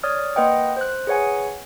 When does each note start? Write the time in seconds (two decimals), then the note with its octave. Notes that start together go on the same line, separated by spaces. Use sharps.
0.03 C#5 D5 D#6 F6
0.36 A#3 B4 D#5 F#5 G5 D#6
0.77 C5 F#6
1.07 G#4 B4 C#5 F#5 G#5